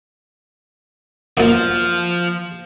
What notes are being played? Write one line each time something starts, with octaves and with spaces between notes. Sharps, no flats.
F#2 A#2 F3